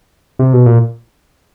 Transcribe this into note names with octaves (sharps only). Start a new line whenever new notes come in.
C3
B2
A#2